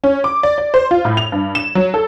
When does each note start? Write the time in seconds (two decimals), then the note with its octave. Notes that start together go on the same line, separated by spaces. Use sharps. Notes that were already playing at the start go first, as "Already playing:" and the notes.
0.04 C#4
0.24 D6
0.43 D5
0.58 D5
0.74 C5
0.91 F4
1.05 A2
1.17 F7
1.32 G2
1.55 E7
1.75 F#3
1.94 A4